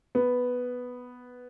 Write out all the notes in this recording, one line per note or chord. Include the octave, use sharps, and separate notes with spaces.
B3